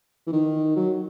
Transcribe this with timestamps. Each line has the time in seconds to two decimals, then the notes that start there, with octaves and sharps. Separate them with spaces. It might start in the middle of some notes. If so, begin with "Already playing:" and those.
0.27 E3
0.33 D#3
0.76 F#3